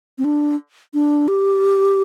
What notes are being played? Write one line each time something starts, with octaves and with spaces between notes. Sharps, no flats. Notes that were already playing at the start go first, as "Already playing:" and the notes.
C4
D4
D4
G4